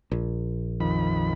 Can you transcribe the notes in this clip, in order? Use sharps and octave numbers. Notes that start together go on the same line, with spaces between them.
A#1
F2 D#3 B5